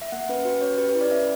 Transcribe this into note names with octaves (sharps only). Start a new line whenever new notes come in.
E5
A#3 F#5
C#4 B4
F#4 B4
C#4 C#5
G4 B4
B4
E4
D5
C#4 E5